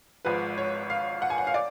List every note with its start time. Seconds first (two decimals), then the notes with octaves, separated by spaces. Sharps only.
0.25 G#1 G#2 F3 B4
0.58 C#5
0.90 F5
1.22 F#5
1.30 G#5
1.38 F#5
1.47 F5
1.54 D5